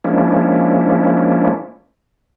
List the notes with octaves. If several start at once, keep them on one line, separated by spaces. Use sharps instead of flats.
F3 G#3 A#3 C#4 D4 E4